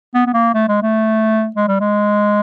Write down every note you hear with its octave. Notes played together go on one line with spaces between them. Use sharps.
B3
B3
A#3
A3
G#3
A3
G#3
G3
G#3